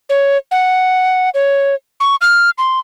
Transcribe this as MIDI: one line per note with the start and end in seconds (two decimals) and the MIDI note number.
0.09 0.38 73
0.51 1.30 78
1.34 1.75 73
2.00 2.16 85
2.21 2.50 89
2.58 2.79 84